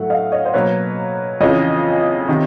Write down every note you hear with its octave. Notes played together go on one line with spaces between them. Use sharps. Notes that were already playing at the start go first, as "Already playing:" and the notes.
Already playing: A2 F#3 A3 E5 F#5
D#5 F5
C#5 D#5
C5
B2 F#3 A#3 B4 C#5
F2 C#3 E3 C#5 D#5
C3 D#3